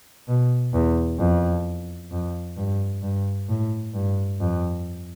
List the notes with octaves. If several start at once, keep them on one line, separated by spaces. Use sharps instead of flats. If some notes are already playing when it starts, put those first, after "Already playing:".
B2
E2
F2
F2
G2
G2
A2
G2
F2